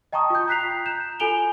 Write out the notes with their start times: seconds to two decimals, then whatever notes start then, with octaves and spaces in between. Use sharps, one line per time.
0.12 D#5 G5 A5 A#5 C#6 D#6
0.30 F4 G6
0.48 A#5 F#6 B6 C7 F7
0.86 G6 E7
1.20 F4 A4 G#5 D7 F7 G7